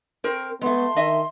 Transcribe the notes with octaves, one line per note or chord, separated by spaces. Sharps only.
C4 A#4
G#3 A3 B3 C6
D#3 D#5 E5